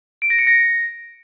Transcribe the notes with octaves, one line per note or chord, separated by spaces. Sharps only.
D7
A#6
C#7
A#6